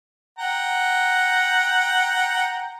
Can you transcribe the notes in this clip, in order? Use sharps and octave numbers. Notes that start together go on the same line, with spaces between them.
F#5 G5 A#5